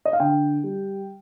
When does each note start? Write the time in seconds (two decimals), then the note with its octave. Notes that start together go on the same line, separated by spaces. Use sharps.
0.05 D#5
0.13 F5
0.20 D3 G5
0.64 G3